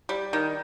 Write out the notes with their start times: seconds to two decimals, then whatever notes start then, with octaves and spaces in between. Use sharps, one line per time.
0.09 G3
0.33 D#3